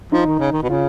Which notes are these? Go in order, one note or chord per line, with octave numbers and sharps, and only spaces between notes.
F3 D#4
D#3
C#3
D#3
B2
C#3 F4